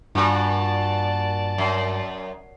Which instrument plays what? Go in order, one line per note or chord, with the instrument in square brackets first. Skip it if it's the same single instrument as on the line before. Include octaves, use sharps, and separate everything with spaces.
[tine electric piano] G2 [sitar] A#2 F#4 [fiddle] D5 A5
[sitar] F#2